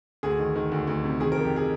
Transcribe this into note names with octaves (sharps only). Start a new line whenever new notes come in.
D2 G#4
D#3
D#3
D2
D2
C3
D#3 G#4
A#4
F2
G4
G#4